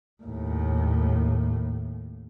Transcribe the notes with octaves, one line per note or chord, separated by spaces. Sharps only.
D#2 A2